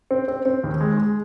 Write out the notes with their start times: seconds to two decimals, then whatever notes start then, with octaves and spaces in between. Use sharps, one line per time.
0.11 C4
0.28 C4
0.46 C4
0.64 D#2
0.81 G#3
0.98 G#3